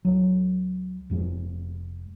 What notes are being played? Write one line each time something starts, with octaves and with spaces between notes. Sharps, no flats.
C#2 F#3
F1 F2 G#3